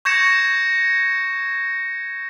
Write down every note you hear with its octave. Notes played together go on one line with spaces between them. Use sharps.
C#6 G6 G#6 A#6 C#7 E7